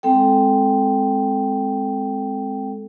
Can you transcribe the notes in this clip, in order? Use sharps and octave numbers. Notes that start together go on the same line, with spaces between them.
G#3 C4 A4 G5